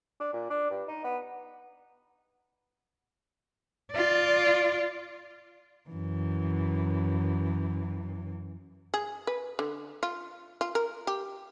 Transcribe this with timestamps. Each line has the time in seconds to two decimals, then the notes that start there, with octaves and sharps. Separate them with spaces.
0.20 D4
0.33 A#2
0.50 D4
0.70 G2
0.88 D#4
1.04 B3
3.92 F4 D5
5.90 F#2 E3
8.94 G#4
9.27 B4
9.59 D3
10.03 F4
10.61 F4
10.75 A#4
11.07 G4